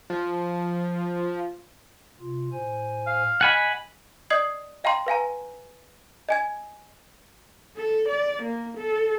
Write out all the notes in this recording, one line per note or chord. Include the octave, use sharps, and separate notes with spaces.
F3
C3 F4
A2 C5 G#5
F5
D#5 F#5 G#5 B5
D5 D#5 D#6 G#6 C7 F#7
D#5 F5 G5 A5 A#5 C6
B4 F5 G#5 A#5
D#5 G#5 G#6
A4
D5
A#3
A4